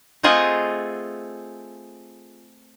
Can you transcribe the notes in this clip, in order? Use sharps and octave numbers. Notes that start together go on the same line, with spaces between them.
A3 C4 F4 G#4 D#5 F#5